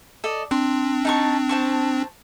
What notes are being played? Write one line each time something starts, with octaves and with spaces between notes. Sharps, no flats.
A4 D5 D#5
C4 D4 C6
D#4 A5 C#6
C5 A5 C#6